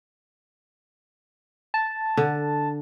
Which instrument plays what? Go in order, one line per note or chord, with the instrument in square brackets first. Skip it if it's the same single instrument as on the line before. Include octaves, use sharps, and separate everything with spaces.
[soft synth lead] A5
[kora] D3